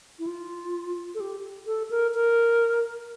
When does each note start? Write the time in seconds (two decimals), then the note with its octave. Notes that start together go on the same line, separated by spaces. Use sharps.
0.19 E4
0.27 F4
1.15 A4
1.20 G4
1.67 A4
1.91 A#4
2.14 A#4